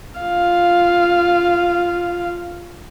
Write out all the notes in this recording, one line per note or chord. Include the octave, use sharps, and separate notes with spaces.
F4 F5